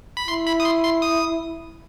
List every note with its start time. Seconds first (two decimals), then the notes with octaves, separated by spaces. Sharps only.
0.17 B5
0.28 E4 C6
0.47 B5
0.60 D#6
0.65 C6
0.84 C6
1.02 D#6